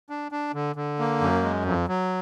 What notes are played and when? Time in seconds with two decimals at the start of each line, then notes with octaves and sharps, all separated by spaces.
0.10 D4
0.32 D4
0.54 D3
0.76 D3
0.99 A#3
1.21 F#2
1.43 G#3
1.65 F2
1.88 F#3